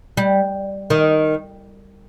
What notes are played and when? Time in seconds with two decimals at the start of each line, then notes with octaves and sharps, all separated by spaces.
0.17 G3
0.90 D#3